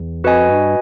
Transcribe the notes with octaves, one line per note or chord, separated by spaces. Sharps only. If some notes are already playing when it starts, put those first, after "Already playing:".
Already playing: E2
F2 F#4 B4 D#5 G#5
G2